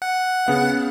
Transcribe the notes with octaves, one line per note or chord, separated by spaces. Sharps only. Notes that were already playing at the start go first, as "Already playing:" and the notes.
F#5
C#3 B3 F5